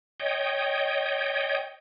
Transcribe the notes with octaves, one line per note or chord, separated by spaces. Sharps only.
C#5 D#5 G5